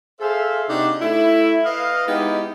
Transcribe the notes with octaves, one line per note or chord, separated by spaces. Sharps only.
G#4 A4 C5 E5 F5
C3 D4 D#4 F#4 G4
A3 E4
B4 D#5 F5
G#3 B3 D#4 E4 G4